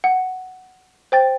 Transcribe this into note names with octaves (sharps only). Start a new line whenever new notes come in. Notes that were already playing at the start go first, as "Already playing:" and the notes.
F#5
C5 G5 A6